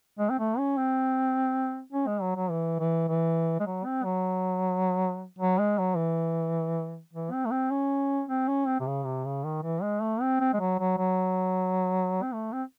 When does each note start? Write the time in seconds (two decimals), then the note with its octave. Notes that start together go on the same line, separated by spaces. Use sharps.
0.19 G#3
0.30 C4
0.39 A3
0.58 C#4
0.77 C4
1.93 C#4
2.07 G#3
2.21 F#3
2.36 F#3
2.51 E3
2.80 E3
3.08 E3
3.60 G#3
3.66 F#3
3.85 C4
4.04 F#3
5.39 F#3
5.59 G#3
5.79 F#3
5.97 E3
7.13 E3
7.32 C4
7.45 A3
7.51 C4
7.71 C#4
8.29 C4
8.48 C#4
8.67 C4
8.80 C3
8.87 C#3
9.05 C3
9.25 C#3
9.44 D#3
9.63 E3
9.82 G#3
10.02 A3
10.21 C4
10.40 C4
10.54 G#3
10.60 F#3
10.79 F#3
10.98 F#3
12.22 C4
12.34 A3
12.53 C4